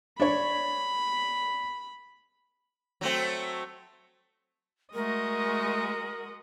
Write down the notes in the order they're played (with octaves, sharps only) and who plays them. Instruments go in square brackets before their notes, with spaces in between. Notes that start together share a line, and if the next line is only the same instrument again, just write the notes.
[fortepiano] D4 C#5 [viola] B5
[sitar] F#3 A3 C4
[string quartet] G#3 F#4 D#5 [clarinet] A3 [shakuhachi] A#4